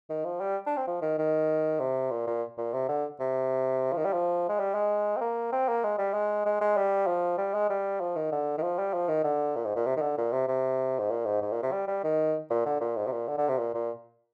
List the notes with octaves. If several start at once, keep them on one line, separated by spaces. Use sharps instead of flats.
D#3
F3
G3
D4
C4
F3
D#3
D#3
C3
A#2
A#2
A#2
C3
D3
C3
F3
D#3
G3
F3
G#3
G3
G#3
C4
A#3
C4
A#3
G#3
G3
G#3
G#3
G#3
G3
F3
G3
G#3
G3
F3
D#3
D3
D#3
F3
G3
F3
D#3
D3
A#2
G#2
A#2
C3
D#3
D3
A#2
C3
C3
G#2
A#2
G#2
G#2
A#2
C3
G3
G3
D#3
A#2
D3
A#2
G#2
C3
A#2
D3
D3
C3
A#2
A#2